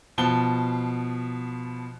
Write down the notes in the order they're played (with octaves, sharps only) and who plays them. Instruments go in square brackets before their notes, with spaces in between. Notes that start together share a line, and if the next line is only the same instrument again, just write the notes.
[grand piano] B2 F3 A5 G7